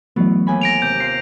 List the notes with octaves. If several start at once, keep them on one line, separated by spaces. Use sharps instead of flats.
E3 F#3 A3 B3
D#2 G#5 B5
A#6 D7 F7
C3 G6
F4 C7